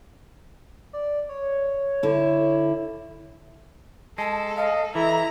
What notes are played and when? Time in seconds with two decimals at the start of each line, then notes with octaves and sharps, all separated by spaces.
0.93 D5
1.29 C#5
2.03 D3 E4
4.18 G#3 A4 A5
4.57 D#5 F5
4.95 E3 E4 A4 A#5